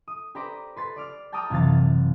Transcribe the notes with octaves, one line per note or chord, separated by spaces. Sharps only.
D#6
G4 B4 C5 D5 A#5 D6
B4 C6 A6
D5 D6 F6
G5 A5 A#5 D6 D#6 F6
F#1 C3 E3 F5 A6